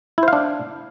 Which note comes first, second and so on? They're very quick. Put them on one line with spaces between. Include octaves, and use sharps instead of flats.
E4 C5 F5 D4